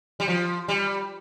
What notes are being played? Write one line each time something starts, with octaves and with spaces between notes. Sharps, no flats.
G3
F3
G3